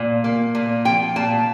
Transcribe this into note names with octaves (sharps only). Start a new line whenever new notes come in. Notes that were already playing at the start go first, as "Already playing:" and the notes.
Already playing: A#2
A#3
A#2
F3 G5
A#2 A5